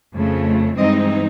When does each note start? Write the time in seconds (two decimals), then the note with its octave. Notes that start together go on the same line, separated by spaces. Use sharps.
0.14 F2 C#3 F3 A3
0.77 G2 E3 G#3 C4 D#4 D#5